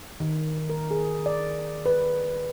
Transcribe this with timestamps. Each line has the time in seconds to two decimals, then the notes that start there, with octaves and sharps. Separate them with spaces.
0.20 D#3
0.70 A#4
0.91 G#4
1.26 D5
1.86 B4